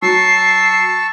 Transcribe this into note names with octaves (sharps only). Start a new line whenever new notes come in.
F#3 A5 C#6 E6 C7